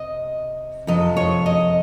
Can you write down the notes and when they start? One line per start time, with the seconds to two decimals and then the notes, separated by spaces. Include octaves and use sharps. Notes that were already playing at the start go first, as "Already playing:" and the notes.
Already playing: C3 D#5
0.87 F2 C3 F3 D#5
1.17 C#5
1.46 D#5